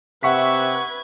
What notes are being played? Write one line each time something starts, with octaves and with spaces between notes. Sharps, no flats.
C3 B4 E5 F#5 C#6 G#6 B6